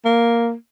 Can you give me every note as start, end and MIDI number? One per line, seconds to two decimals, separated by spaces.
0.05 0.53 58